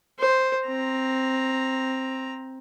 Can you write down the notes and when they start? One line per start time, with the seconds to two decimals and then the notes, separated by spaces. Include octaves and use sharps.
0.19 C5
0.67 C4 A#5